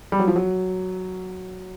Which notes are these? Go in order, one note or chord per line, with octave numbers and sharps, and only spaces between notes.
G3
F#3
F3
F#3